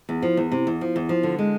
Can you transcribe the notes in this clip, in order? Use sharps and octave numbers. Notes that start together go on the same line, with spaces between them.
E2
F3
E2
C3
E2
F3
E2
F3
D3
G#3